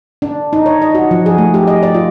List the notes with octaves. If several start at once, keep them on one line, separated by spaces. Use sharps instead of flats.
D4
D#4
C#5
D#5
F#4
F3
G#4
A3
G4
D#5
D5
F4